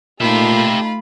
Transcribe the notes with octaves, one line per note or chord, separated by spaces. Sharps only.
A#2 A3 D#4 F4 G4 A4 E5 B5